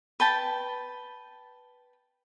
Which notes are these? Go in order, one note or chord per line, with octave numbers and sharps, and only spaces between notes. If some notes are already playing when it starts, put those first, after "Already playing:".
B4 G5 A5 B5